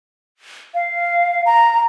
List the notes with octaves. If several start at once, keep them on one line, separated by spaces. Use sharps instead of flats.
F5
A#5